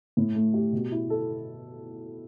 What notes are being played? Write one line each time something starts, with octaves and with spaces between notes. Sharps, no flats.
A2
A3
G4
B2
E4
A4